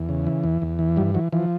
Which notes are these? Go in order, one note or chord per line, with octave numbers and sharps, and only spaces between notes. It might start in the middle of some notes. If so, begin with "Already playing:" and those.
Already playing: E2
C#3
E3
E2
E2
E3
G2 F3 G3
E3 F#3
E3 F3